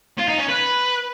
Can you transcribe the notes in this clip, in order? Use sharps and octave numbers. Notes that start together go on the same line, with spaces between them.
F4
D#4
C#4
B4